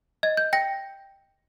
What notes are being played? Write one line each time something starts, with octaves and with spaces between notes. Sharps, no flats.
D#5 G#6
G6
G5 A#6